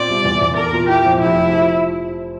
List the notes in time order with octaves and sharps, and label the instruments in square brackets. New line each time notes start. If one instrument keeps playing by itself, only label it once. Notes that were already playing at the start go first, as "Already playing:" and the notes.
Already playing: [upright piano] A#2 C4 [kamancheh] D5
[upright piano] C2
E2
E2
[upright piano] A4 [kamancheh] A#4
[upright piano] A#2
[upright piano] E4 [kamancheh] G4
[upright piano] F2
[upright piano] F1 [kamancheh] E4
[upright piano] F1
F3